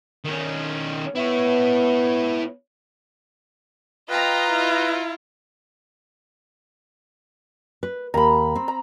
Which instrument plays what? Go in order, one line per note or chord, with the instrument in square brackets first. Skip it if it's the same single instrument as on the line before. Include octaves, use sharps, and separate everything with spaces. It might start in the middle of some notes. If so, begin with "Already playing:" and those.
[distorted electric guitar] D#3 C#4
[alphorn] B3 [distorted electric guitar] E4 C#5
[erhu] F4 [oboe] B4 [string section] D#5 A#5 [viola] G5
[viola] E4
[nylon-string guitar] B4
[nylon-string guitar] D#2 [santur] A#5 B5
[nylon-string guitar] C4
[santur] A#5